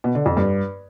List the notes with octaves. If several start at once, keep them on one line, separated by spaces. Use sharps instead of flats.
B2
D3
F2
G2